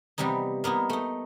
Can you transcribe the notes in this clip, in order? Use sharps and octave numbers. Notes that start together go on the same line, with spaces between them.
C3 E3 G3 B3 D#4
A#3 B3 D#4 E4
A3 D#4